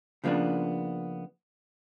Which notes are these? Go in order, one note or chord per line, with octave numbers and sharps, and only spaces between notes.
C#3 F3 A#3 B3 D4